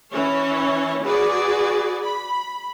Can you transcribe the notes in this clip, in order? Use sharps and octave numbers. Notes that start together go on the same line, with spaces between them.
E3 C#4 C#5
F#4 G#4 B4 D5
B5